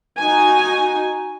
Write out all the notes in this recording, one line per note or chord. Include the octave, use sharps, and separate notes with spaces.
D#4 F#4 G#5